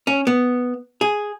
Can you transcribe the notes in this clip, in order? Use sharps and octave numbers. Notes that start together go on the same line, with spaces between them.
C#4
B3
G#4